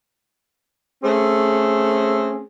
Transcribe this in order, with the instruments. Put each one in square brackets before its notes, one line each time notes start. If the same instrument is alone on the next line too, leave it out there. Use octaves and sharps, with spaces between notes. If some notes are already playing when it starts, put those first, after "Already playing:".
[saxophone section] A3 C4 C#4 G#4